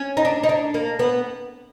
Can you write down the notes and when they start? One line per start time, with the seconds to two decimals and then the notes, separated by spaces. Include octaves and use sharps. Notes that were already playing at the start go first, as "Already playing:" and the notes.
Already playing: C#4
0.17 D#4
0.25 D4
0.43 D#4
0.49 D4
0.74 A#3
0.99 B3